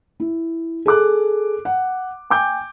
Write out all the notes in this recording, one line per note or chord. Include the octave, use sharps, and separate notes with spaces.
E4
G#4 A4 D6 F#6
F#5
G5 G#5 D6 G6